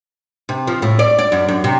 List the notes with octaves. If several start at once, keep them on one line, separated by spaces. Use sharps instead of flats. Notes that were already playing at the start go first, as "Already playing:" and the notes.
C3
F3
A2
D5
D5
F#2
F#2
C3